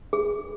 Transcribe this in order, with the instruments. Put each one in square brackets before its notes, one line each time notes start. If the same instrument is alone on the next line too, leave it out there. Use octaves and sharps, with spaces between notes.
[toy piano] G#4